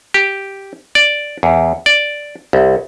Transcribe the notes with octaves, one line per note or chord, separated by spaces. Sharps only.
G4
D5
E2
D5
C2